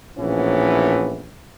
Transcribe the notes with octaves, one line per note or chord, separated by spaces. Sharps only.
A#1 A2 E3 B3 C#4